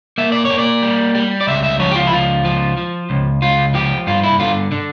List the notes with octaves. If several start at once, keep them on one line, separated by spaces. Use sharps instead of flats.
A#3 E5
D5
A#3 C#5
D5
G3
G3
D5
C#2 E5
E5
F3 C#5
G4
F4
E4
C#2 F4
F3
F3
C#2
C#2 F4
F3 G4
G2 F4
E4
D3 F4
D3